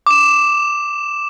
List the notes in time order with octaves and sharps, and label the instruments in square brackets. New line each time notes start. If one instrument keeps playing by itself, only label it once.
[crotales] D6 E7